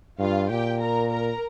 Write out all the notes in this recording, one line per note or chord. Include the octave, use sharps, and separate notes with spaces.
G2 F4 F5
A#2 G4 G5
A#4 A#5
A#4 A#5